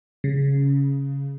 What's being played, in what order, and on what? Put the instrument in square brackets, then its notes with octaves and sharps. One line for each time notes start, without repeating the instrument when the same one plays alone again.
[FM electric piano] C#3